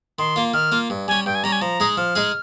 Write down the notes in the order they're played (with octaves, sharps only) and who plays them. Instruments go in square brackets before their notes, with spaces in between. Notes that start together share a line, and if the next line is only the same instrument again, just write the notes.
[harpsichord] D#3 [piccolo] C6
[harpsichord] A#3 F4
[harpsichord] D#3 [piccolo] F6
[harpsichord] A#3 F4
G2
[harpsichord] G3 C#4 [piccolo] G#5
[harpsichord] G2 [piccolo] G5
[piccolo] G#5
[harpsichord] G3 C#4 [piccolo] A#5
[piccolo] G#5
[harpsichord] F3 [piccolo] A#5
[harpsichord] G#3 D#4 G#4
[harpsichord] F3 [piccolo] F6
[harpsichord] G#3 D#4 G#4